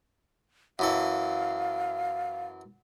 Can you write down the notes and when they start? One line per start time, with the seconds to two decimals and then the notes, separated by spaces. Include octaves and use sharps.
0.79 F#2 E3 A4 F5